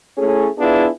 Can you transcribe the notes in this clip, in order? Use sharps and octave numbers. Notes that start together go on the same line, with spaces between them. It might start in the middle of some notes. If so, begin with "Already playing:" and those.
A3 C#4 E4 G#4 A4 C#5
B3 D4 E4 F4 G#4